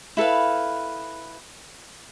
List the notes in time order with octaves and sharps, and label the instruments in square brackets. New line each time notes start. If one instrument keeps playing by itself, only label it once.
[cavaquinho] E4 A4 B4 F5